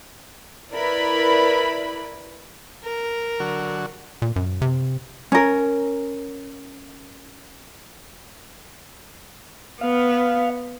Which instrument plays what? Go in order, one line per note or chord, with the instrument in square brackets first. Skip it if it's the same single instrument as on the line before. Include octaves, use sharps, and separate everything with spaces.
[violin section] E4 A#4 B4 D5 B5
[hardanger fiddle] A#4
[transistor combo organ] D3 F#3 F#4
[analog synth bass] A#2
F#2
C3
[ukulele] C#4 A#4
[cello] B3 [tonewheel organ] F5